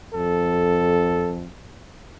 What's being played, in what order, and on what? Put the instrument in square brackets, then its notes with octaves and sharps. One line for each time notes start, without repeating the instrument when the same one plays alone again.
[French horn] F2 [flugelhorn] A4